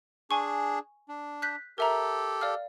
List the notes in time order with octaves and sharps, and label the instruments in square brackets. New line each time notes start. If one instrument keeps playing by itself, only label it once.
[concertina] D4 G#4 [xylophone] G#5 C#6
[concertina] D4
[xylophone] F#6 G6 B6
[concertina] G4 A4 [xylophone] A#4 E5 A#5
[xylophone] D5 F5 F6